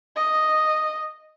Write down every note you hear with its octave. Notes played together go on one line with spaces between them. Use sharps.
D#5